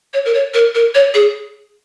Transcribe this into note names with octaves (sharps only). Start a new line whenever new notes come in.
C#5
A#4
C#5
A#4
A#4
C#5
G#4